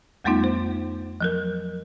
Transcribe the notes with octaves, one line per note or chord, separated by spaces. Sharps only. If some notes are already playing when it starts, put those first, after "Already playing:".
F2 G3 A3 B3 D#4 F4
C5
F3 F#3 A#4